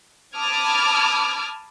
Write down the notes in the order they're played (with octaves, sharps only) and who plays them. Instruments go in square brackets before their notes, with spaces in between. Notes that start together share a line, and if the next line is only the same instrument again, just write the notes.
[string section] A5 B5 D6 D#6 F6 G#6